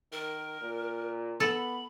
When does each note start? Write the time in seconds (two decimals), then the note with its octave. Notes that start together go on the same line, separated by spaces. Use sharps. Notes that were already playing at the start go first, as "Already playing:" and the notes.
0.12 D#3 A#4
0.61 A#2
1.40 B3 A4 B5